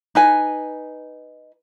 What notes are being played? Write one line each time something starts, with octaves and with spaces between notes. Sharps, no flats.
D#4 B4 G#5